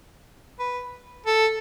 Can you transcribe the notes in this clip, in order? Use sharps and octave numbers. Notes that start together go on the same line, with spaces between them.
B4
A4